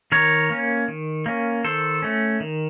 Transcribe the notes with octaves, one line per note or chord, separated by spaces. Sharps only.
D#3 A#4 C#5
A#3 C#4
D#3
A#3 C#4
D#3 A4 C5
A3 C#4
D#3